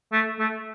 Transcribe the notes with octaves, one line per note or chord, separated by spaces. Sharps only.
A3
A3